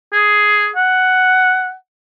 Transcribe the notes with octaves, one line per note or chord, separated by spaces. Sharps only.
G#4
F#5